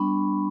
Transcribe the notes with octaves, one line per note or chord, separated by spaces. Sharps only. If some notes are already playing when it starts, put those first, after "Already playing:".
Already playing: G3 B3 D4 B5 C#6